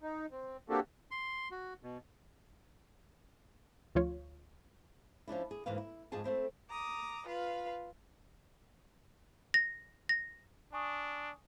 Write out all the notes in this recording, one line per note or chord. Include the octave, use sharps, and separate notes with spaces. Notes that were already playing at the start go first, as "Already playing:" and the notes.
D#4
C4
A#3 C4 D4 F#4 G4 A4
C6
F#4
B2
D2 F3 F4 C#5
F3 C#4 D4 E4
G#4
D2 G#2 E3 A#3 B4 F5
E4
F2 G#2 D#4 F4 G#4 A5
A3 A#3 C4 E4
A#5 D6 D#6
F4 B4 F5
A#6
A#6
D4 G#5 C#6 D#6